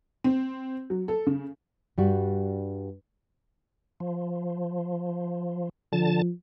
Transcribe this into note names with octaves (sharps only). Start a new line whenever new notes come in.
C4
F#3
A4
C#3
G2 G3 F#4
F3
D3 F3 A5